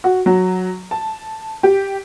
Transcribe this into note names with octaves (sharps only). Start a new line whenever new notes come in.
F#4
F#3
A5
G4